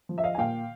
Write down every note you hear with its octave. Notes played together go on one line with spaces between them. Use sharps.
F3
E5
D#5 F5
G#5
A#2 F5 G5